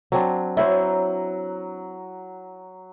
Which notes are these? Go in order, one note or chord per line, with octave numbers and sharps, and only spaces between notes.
F#3 C4 D4
F#3 E4 C5